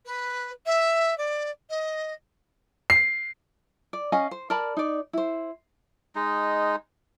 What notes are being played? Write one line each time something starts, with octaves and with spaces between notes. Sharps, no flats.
B4
E5
D5
D#5
C7
D5
C#4 D#5 F5 G#5
C5
A#4 D5 A5 B5
D#4 D5
E4 C5
G#3 D#4